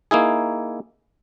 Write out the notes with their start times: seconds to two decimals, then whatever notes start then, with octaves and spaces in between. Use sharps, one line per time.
0.11 A#3 D#4 E4 G#4